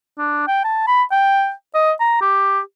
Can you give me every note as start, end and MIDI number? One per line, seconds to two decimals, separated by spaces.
0.18 0.43 62
0.48 0.62 79
0.64 0.85 81
0.87 1.03 83
1.12 1.52 79
1.74 1.92 75
2.00 2.18 82
2.21 2.60 67